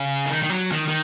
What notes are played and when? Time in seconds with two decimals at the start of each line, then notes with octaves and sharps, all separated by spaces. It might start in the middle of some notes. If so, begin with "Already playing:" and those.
Already playing: C#3
0.26 D#3
0.43 D#3
0.50 F#3
0.72 D#3
0.88 D#3